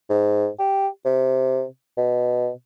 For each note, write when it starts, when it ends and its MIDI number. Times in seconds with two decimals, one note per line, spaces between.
0.10 0.48 44
0.59 0.88 67
1.05 1.65 48
1.98 2.49 47